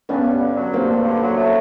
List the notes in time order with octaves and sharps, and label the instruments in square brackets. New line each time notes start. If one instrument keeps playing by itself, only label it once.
[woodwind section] G2 [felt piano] B3 C#4
[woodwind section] G2
D3
F#3
[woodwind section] G2 [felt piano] A#3 C4
[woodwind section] G2
D3
F#3
A3